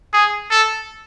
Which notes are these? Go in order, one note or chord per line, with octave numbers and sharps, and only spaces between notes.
G#4
A4